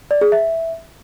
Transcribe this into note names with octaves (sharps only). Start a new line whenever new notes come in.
D5
G#4
E5